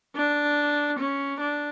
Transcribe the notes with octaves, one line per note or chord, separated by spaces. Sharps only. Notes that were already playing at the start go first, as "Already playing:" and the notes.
D4
C#4
D4